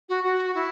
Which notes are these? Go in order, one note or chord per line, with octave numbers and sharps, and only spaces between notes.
F#4
F#4
E4